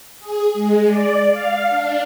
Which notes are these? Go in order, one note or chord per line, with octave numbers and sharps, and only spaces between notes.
G#4
G#3
D5
F5
D4